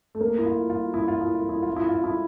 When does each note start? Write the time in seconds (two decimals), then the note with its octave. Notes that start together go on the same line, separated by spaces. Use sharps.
0.15 A3
0.21 A#3
0.39 E4
0.46 F4
0.70 F4
0.94 E4
1.08 F4
1.21 E4
1.35 F4
1.49 E4
1.63 F4
1.76 E4
1.89 F4
2.04 E4